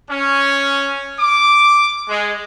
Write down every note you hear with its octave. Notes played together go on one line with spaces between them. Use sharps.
C#4
D6
G#3